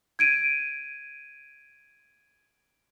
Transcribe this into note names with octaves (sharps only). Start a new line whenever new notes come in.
G#6 D7 D#7